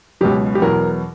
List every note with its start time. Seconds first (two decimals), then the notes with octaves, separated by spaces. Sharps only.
0.21 C#2 B2 F#3 G4
0.55 G4
0.61 E2 B2 F#3 A#4